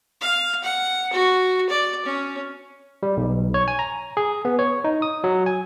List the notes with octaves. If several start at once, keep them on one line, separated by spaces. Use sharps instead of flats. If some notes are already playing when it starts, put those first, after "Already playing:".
F5
F#5
F#4
D5
C#4
G3
B1
C#5
G#5
A#5
G#4
B3
C#5
D#4
D#6
F#3
G#5